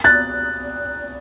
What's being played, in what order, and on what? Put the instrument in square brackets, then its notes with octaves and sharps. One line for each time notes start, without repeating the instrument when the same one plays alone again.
[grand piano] F#6 A6